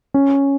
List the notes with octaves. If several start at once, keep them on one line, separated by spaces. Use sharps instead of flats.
C#4